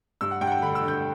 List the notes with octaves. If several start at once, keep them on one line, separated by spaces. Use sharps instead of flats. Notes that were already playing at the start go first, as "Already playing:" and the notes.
G2 E6
F#5
G2 G5
F#5
G5
D3 B5
E6
D3
G6